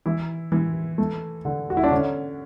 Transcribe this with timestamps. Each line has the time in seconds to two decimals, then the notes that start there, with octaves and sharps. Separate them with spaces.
0.06 E3 E4
0.52 E3
0.98 A3
1.45 D3
1.70 F#4
1.77 E4
1.84 D4
1.91 D3 C#4